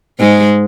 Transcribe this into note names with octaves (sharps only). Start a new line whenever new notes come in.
G#2 G#3